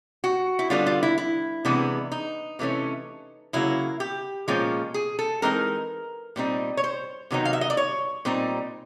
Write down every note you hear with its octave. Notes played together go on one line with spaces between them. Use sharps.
F#4
E4
D3 G3 B3 D4 F4
F4
E4
E4
C3 E3 G#3 B3 D4
D#4
C3 E3 A3 C#4
C#3 F#3 A#3 E4
G4
A#2 F3 G#3 C#4
G#4
A4
E3 G#3 C4 D#4 A#4
A#2 G3 C4 D#4
C#5
C5
C3 D#3 F#3 B3 D#4
F5
E5
D#5
D5
C#5
A#2 G3 C4 D#4